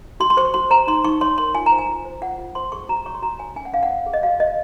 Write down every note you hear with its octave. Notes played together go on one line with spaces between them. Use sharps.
F#4 C6
C6
C5 C#6
F#4 C6
C5 A#5
D#4 C6
D#4 C#6
C#5 C6
A#4 C6
F4 G#5
A#5
C5
G#5
F4
C5
F4 F#5
F4
C5 C6
G#4 C#6
F#4 A#5
C#5 C#6
C6
F#4 A#5
C#5 G#5
C#4 G#5
F#5
C#4 F5
F#5
C#5
G#4
D#5
F#4 F5
C#5 D#5